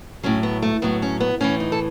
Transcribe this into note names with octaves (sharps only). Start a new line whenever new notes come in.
A2 F#3 C#4
B3
A3
A2 F#3 B3
C#4
B3
A2 E3 C#4
D#4
A4